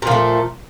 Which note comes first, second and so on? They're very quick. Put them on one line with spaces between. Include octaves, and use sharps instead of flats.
A#2 F3 A3